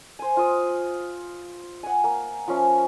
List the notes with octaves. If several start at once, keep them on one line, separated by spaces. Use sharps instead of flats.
C5 G#5
F4 D#6 E6
F#5 G#5
A#3
F3 C#4 E5